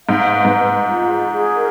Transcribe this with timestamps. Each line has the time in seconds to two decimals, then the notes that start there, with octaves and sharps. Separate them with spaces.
0.08 G#2 F5
0.33 B4
0.45 G#2
0.58 B4
0.83 F4
1.07 G#4
1.32 G#4
1.56 A#4